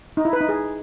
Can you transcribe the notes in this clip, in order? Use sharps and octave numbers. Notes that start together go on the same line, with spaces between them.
D#4
E4
B4
D#4
G#4